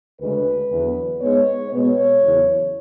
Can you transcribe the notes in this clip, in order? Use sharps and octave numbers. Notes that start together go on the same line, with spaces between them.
D2 C#3 G#3 B4
E2 D3 F#3 B3
G#2 G#3 B3 C#5
B2 G#3 B3 C#5
E2 C#3 F#3